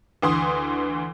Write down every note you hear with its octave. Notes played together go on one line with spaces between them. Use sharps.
D2 E3 C6 D#6